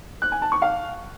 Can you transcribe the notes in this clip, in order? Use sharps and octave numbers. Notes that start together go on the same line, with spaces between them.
F#6
G#5
A5
C#6
F5